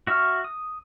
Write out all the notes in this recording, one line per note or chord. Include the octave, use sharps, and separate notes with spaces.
F#4 E5 C#6 F6
D#6